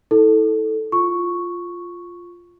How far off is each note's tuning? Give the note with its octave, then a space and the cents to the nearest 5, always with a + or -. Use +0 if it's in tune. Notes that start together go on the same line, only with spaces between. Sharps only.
E4 -30 A4 +0
F4 +0 C#6 +0